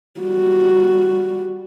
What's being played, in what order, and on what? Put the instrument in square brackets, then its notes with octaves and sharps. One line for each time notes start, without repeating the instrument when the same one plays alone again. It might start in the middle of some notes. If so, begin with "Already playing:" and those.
[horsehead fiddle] G3 F#4